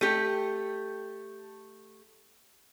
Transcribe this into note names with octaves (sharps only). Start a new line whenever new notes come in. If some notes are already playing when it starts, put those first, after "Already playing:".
A3 G4